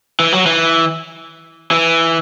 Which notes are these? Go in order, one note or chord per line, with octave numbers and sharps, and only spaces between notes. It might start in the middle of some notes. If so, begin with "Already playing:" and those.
E3
F#3
E3
E3